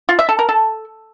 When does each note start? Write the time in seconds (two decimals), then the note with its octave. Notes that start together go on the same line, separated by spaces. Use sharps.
0.09 F4
0.19 E5
0.29 A4
0.39 A#4
0.49 A4